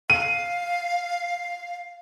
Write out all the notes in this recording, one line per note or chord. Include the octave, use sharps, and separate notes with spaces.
F5 D#7